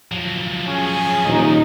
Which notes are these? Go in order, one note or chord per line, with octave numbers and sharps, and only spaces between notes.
F3 F#3
C#4 G#4
D#1 D#4